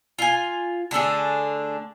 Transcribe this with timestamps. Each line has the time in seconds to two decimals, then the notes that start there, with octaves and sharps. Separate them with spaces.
0.19 F4 G#5
0.91 D3 A3 D4 G#4